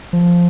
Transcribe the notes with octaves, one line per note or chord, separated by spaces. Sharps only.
F3